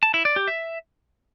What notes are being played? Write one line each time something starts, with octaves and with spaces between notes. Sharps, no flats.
A5
E4
D5
G4
E5